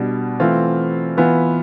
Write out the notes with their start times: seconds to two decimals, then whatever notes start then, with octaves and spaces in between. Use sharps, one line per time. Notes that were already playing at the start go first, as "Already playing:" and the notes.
Already playing: B2 G3 D4
0.40 E3 A3 C4 F4
1.17 E3 B3 F4 B4